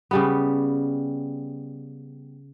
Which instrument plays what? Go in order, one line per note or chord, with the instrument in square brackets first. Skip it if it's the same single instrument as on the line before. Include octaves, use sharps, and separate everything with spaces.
[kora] C#3 G3 B3